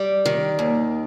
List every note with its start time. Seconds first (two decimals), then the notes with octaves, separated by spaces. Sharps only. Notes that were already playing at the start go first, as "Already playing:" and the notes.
Already playing: G3 D5
0.26 D#3
0.59 D#2